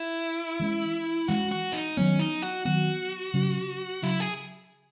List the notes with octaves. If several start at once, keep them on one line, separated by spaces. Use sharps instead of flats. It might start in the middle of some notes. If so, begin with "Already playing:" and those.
Already playing: E4
E3 G#3 C#4
E3 G#3 C#4 F#4
F#4
D#4
D#3 F#3 B3 C#4
D#4
F#4
D#3 F#3 B3 F#4
C#3 F#3 C#4
C#3 F#3 C#4 E4
G#4